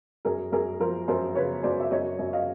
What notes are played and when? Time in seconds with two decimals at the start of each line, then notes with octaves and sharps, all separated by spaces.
0.25 F#2 G#4 A#4
0.52 F#2 G#4 A#4
0.80 F3 A#4 C5
1.08 F#2 A#4 C5
1.35 C#3 B4 C#5
1.63 F#2 C5 D5
1.80 E5
1.91 F#2 C#5 D#5
2.19 F#2
2.33 D#5 F5